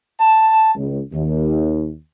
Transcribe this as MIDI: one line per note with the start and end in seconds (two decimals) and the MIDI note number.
0.20 0.74 81
0.75 0.99 37
1.13 1.91 39